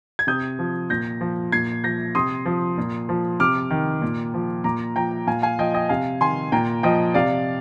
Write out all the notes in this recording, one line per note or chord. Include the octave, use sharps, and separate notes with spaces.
G#6
C3 D#6 G6
F3
A#2 G6 A#6
F3
A#2 G#6 C7
F3 G6 A#6
C3 C6 D#6
F3
A#2
F3
C3 D6 F6
D#3
A#2
F3
A#2 A#5 D6
F3 G5 A#5
A#2 F5 G#5
F5 G#5
F3 D#5 G5
D#5 G5
C3 F5 G#5
D#3 G#5 C6
A#2 G5 A#5
F3 D#5 G5
C3 D5 F5